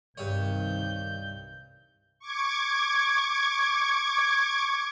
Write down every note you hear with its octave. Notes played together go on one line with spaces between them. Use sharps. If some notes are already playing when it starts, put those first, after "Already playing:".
C2 G2 C3 D#3 C#5 G6
C#6 D6 G#6